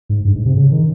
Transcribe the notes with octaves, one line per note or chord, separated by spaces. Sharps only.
G#2
G2
G#2
C3
C#3
D#3